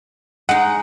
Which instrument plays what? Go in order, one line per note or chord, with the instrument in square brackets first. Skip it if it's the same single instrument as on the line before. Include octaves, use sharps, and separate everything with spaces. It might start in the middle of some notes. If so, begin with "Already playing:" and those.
[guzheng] G#3 D#4 [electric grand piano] F#5